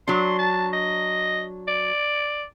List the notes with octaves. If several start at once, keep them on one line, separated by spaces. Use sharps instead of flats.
F#3 D4 C6
A5
D#5
D5